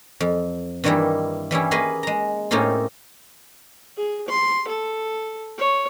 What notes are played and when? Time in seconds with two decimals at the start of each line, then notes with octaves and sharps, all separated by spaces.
0.20 F2
0.84 G2 D#3 E3 G3 A#3 E4
1.51 E3 G3 C#4 E4
1.71 A#3 F#4 G#4 B4 D#5 G#5
2.03 G#3 A#5
2.51 A2 A#3 C4 C#4 D#4 F4
3.97 G#4
4.28 C6
4.68 A4
5.58 C#5